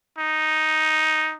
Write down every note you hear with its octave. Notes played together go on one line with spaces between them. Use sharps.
D#4